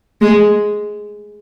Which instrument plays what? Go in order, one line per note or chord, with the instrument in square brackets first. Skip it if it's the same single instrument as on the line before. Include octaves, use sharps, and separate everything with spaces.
[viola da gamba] G#3